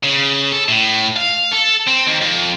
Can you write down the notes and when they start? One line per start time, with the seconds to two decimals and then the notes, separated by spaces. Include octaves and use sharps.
0.04 C#3
0.52 A4
0.68 A2
1.16 F5
1.52 A4
1.88 C4
2.07 D#2
2.22 F2